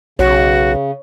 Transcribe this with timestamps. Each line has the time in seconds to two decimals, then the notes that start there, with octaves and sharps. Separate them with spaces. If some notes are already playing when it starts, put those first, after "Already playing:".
0.19 B1 C#3 F#4 C#5